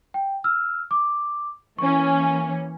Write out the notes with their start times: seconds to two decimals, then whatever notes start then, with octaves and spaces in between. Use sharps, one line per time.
0.14 G5
0.44 E6 F6
0.91 D6
1.79 E3 A#3 C#4 C#6